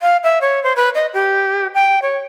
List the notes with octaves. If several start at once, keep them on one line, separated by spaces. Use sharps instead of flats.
F5
E5
C#5
C5
B4
D#5
G4
G5
C#5